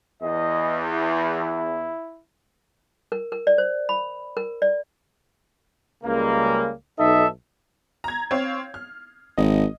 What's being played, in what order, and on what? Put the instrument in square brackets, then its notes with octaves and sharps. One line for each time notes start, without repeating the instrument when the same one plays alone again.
[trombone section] E2 [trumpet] D#5
[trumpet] E4
[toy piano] A#4
A#4
D5
C5
B5
A#4
D5
[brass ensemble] C#2 C#3 G3 G#3 A#3
B1 D#4 A4 D#5 E5
[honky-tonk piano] A#5 G#6
C4 C#5 F5
F6
[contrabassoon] G#1 [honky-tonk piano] D#5